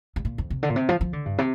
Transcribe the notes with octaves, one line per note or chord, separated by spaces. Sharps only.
G2
A#2
F2
C3
D3
A#2
C3
F3
F3
D3
G2
C3